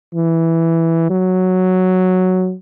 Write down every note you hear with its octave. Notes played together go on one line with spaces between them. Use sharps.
E3
F#3